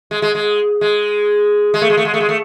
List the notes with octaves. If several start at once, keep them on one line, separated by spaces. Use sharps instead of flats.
G#3
G#3
G#3
G#3
G#3
A3
G#3
A3
G#3
A3
G#3
A3